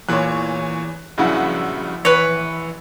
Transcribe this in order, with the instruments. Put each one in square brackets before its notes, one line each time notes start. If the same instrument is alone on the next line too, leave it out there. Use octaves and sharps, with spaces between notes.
[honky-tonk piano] E2 C#5 [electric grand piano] A#2 F#6
[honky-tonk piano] A#1 E4 F#5 [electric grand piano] G2 C#3 F#3
[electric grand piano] E3 [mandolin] B4 C#5